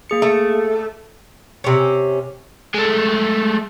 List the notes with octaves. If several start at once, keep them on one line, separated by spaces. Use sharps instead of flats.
A#3 G#4 C#7
A3
C3 C#4
G#3 A3